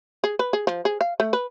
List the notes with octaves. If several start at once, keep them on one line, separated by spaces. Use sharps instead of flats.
G#4
B4
G#4
F3
G#4
F5
A3
B4